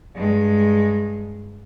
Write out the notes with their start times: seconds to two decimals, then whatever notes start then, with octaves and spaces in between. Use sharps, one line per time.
0.14 G2 G#3